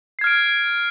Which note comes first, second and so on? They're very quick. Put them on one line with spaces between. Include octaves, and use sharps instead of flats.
C7 G#6 F6 D7